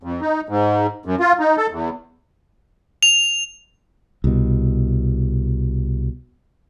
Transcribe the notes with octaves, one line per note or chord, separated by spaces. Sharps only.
F2
D#4
G#2
F#2
F4
D#4
A4
E2
F7
C2 B2